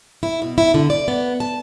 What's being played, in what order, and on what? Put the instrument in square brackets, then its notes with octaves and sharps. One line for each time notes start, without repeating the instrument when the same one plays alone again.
[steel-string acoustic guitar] E4
B2
E4
D3
D5
B3
A5